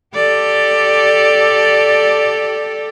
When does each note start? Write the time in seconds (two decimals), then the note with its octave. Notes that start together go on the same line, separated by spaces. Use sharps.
0.14 G4 A4 D5